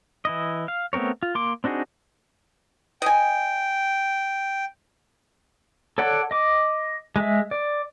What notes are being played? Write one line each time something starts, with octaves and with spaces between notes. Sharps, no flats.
E3 E4 D#5
F5
A3 B3 C4 A#4 C#5
F4
A#3 C6 D6
C4 D4 D#4 F#4 G#4
D#5 G5 G#5
A4 C#5 D5 F#5
D#5 D6
G#3 E5
D5